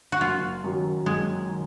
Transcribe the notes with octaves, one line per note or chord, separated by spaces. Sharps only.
F#4
F#1 F4
F#2 D#3 F#3
F#1 G#3
D#3